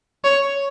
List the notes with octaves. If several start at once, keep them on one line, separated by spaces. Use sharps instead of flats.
C#5